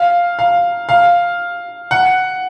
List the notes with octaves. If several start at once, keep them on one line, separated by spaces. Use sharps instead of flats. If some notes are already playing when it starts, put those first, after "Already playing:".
Already playing: F5
F5
F5
F#5